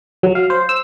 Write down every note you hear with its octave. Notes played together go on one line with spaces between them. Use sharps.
F#3
F5
C5
E6